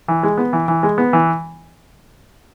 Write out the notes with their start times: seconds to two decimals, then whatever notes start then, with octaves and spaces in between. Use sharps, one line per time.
0.08 E3
0.23 G#3
0.38 B3
0.53 E3
0.68 E3
0.83 G#3
0.98 B3
1.13 E3